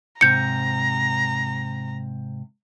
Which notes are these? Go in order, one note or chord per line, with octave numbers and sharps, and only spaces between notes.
G#2 C3 A#5 G6 C#7